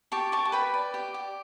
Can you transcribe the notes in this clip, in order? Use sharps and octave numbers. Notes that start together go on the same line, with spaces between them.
G4 A5 C#6
G4 A5 C#6
A5
B4 G5 B5
D5
G4
G4